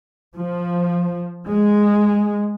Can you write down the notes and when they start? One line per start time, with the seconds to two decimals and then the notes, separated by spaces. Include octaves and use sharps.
0.36 F3
1.48 G#3